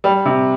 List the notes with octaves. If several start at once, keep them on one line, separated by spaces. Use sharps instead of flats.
G3
C3